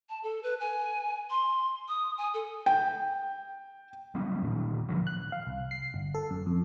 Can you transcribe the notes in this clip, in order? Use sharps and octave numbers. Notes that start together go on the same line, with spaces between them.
A5
A4
B4
G#5
C6
D#6
G#5
A4
G5
F#3 G3 B3 C#4
D1 A#2 D#3
A2 D3 F3 F#3
F#6
F5
C2
C7
G1
A4
F#2
F2